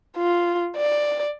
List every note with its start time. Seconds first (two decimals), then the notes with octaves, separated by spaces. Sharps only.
0.17 F4
0.77 D5